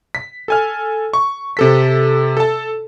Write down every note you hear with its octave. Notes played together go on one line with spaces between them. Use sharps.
B6
A4 G#5 F6
C#6
C3 A4 B6
A4 A5